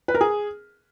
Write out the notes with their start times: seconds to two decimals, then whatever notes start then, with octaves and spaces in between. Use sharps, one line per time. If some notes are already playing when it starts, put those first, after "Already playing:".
0.08 B4
0.15 A#4
0.21 G#4